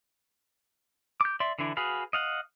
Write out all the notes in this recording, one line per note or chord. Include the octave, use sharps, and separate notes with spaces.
D6 G6
D5 E5 C6
D3 E3 D4 E4
F#4 G#4 B4 F5
D#5 F5 F#5